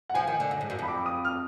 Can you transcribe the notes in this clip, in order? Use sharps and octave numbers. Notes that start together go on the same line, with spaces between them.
F#5
F3 G#5
D#3
D3
F#2
G#2
F#2
F2 B5
D6
D#6
F6